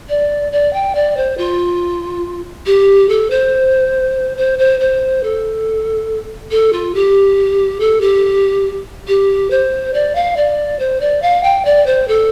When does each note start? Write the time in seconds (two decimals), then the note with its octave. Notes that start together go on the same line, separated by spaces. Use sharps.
0.09 D5
0.52 D5
0.73 G5
0.95 D5
1.17 C5
1.37 F4
2.66 G4
3.09 A4
3.30 C5
4.37 C5
4.58 C5
4.80 C5
5.23 A4
6.51 A4
6.72 F4
6.94 G4
7.80 A4
8.01 G4
9.08 G4
9.50 C5
9.93 D5
10.15 F5
10.37 D5
10.79 C5
11.00 D5
11.22 F5
11.43 G5
11.65 D5
11.86 C5
12.08 A4